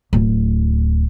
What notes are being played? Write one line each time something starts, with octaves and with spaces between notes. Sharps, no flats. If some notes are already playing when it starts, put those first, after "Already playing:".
D1